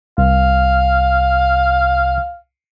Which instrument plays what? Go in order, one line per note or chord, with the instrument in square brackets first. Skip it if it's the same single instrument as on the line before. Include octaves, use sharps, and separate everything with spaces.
[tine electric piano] C2 [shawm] F5